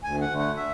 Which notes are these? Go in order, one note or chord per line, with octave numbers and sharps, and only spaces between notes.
D2 G#5
F#5
D3 A3
F#5
E5